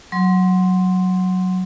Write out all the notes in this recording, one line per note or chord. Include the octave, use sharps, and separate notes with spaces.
F#3 C6